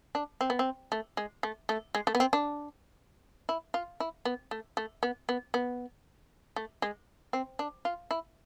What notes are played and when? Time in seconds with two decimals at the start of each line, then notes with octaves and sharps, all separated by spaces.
0.15 D4
0.41 C4
0.50 B3
0.59 C4
0.92 A3
1.17 G#3
1.43 A3
1.69 A3
1.95 G#3
2.07 A3
2.15 B3
2.20 C4
2.33 D4
3.49 E4
3.74 F4
4.00 E4
4.25 B3
4.51 A3
4.77 A3
5.03 B3
5.29 B3
5.54 B3
6.56 A3
6.82 G#3
7.33 C4
7.59 D4
7.85 F4
8.11 E4